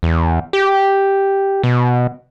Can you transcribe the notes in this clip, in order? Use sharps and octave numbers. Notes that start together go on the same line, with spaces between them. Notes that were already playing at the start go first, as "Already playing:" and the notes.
E2
G4
B2